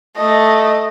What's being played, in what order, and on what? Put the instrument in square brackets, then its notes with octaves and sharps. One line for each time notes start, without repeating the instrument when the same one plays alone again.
[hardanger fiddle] A3 [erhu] D#5